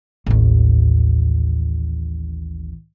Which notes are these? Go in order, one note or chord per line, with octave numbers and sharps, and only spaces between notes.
A1 D#2